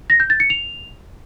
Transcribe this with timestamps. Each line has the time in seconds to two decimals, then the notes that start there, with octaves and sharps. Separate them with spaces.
0.10 A#6
0.20 G6
0.30 A6
0.40 C#7
0.50 F7